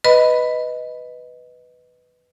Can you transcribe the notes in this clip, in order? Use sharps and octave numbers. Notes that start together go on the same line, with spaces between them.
B4 D#5 B5